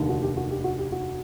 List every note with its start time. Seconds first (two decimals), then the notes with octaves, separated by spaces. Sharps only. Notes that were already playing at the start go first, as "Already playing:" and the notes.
Already playing: F1 D#2 D3
0.09 F#4
0.23 G4
0.37 F#4
0.51 G4
0.64 F#4
0.78 G4
0.92 F#4